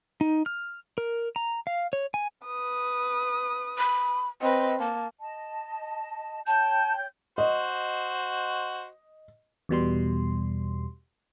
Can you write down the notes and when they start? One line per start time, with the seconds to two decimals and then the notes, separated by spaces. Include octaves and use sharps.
0.21 D#4
0.46 F6
0.98 A#4
1.36 A#5
1.67 F5
1.93 C#5
2.14 G#5
2.46 B4 D#6
3.78 B5
4.41 C4 B4 D#5
4.80 A#3 A5
5.20 D#5 A5
6.47 C#5 G5 A5 G6
7.38 F#4 C5 D#5
9.69 E2 B2 G3 C6